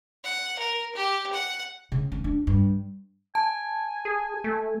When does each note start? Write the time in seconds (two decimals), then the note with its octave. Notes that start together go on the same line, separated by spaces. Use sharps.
0.24 F#5
0.59 A#4
0.95 G4
1.33 F#5
1.92 C#3
2.12 C#4
2.24 D4
2.47 G2
3.35 G#5 A5
4.05 G#4
4.44 A3